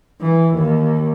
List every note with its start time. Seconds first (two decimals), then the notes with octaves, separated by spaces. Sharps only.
0.21 E3
0.55 D#2